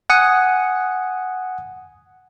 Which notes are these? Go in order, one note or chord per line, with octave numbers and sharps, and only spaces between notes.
F#5 G#5 D#6 C#7